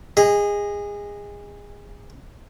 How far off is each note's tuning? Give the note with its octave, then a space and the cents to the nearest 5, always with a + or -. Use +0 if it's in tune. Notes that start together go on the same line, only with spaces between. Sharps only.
G#4 -25 D#5 +5